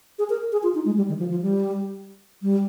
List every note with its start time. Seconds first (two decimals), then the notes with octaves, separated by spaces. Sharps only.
0.19 G#4
0.30 A#4
0.52 G#4
0.63 F4
0.75 D#4
0.85 G#3
0.97 G3
1.09 D#3
1.19 F3
1.31 F3
1.42 G3
2.42 G3